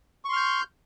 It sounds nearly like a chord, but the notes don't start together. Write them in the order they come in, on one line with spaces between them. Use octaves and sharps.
C#6 C6 F6 G6